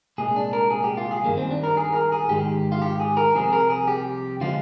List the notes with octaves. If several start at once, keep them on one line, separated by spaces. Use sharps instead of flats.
C2 A#2 G#3 G#4
D4
A#4
G#4
G4
F4
G#4
G2 D#3 G3 A#3
C4
D4
A#4
G#4
A#4
G#4
G#2 D#3 G#3 G4
F4
G4
G#4
A#4
C2 C3 F3 G#4
A#4
G#4
G4
D3 F3 G#3 F4